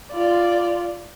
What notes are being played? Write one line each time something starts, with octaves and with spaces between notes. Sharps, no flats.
F4 D5